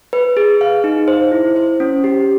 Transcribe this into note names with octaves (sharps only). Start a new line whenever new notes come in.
B4
G#4
F5
D#4
C5
E4
C5
C#4
G4